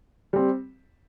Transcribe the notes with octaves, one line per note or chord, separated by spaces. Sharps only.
G3 C4